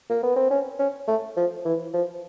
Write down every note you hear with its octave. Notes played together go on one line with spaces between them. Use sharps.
A#3
B3
C4
C#4
C#4
A3
F3
E3
F3